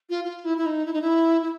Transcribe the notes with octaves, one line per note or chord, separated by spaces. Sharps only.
F4
F4
E4
E4
D#4
E4
D#4
E4
E4